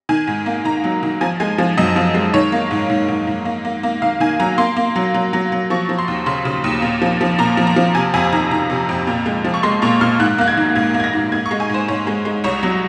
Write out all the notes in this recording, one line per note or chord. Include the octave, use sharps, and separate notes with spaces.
D#3 G#5
G#2
A#3
D#3 A#5
F#3
D#3
F3 G#5
G#3 G#5
F3
F#2 D#5
F3
G#3
D#3 C#5
A#3
G#2
G#2
G#2
G#2
A#3
A#3
A#3
D#3 F5
D#3 G#5
F#3 A#5
A#3 C6
A#3
F#3
F#3
F#3
F#3
F3 C#6
F3
C6
D#2
C#3 C6
C#3
D#2
A#2
F3
F3
A#2 A#5
F3
A#5
F3
C3 G#5
F2 G#5
G#5
D#3 A#5
D#3 A#5
C3
F2
A#2
G#3
F3
C#6
G#3 C6
A#2 C#6
A#2 F6
G#2 F#6
A#3 F#6
G#6
D#3
G#2 G#6
A#3
G#6
A#6
G#2
G#2 G#6
C#6
G#3
G#5
G#2 C5
G#2 C#5
G#3
G#3
C2 C#5
F#3